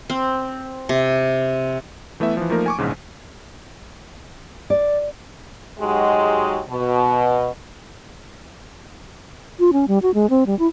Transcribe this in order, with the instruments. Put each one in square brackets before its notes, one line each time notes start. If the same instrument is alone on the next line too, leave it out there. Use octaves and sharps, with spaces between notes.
[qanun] C4
C3
[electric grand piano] E3 A3 B3 E4 E5
E3 F3
F3 A3 A#3 D#4 A#4
G#5 C#6 D6
A#1 E2 G#2 C#3
[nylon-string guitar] D5
[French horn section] G#2 F#3 G#3 F#4 G4 D#5
B2
[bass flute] F4
C#4
G3
F#4
G#3
C4
G3
E4